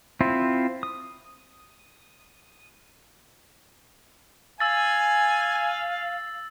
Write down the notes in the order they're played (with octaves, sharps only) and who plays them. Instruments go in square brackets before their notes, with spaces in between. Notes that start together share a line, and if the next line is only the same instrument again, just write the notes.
[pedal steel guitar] C4 E4 F4
D#6
[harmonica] F5 [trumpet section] G#5 [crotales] E6 A6